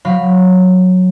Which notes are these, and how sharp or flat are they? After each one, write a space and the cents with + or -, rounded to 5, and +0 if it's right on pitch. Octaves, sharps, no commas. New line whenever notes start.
F#3 -10 F5 +0 B5 +0